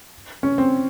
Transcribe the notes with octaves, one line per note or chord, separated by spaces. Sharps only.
C#4
C4